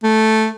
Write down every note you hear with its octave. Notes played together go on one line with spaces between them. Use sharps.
A3